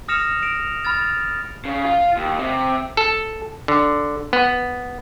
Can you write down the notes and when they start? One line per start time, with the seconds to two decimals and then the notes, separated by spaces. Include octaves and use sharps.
0.08 D#6 F6 A#6 C#7 E7 F7
0.42 A#6 D7 F7
0.85 B5 F6 A6
1.65 C#3
1.85 F4
2.17 D#2
2.39 C3
2.97 A4
3.68 D3
4.33 B3